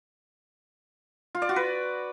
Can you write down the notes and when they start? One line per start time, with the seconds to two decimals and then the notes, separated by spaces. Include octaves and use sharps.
1.35 F4
1.42 D5
1.49 F#4
1.56 B4